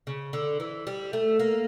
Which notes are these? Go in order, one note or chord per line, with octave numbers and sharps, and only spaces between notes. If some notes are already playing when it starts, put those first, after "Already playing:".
C#3
D3
E3
G3
A3
A#3